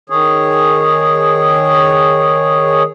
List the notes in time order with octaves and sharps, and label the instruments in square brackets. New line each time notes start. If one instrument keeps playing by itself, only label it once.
[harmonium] D#3 G#4 C#5